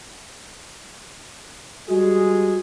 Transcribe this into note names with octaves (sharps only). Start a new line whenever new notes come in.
G3 G#3 F#4 G#4